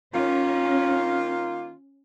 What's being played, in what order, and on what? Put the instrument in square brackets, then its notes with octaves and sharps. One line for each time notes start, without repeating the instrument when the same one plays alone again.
[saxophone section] D#3 A#3 F4 [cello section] C#4